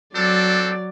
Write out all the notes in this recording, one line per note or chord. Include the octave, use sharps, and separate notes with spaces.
F#3 C4 D4 A4 D5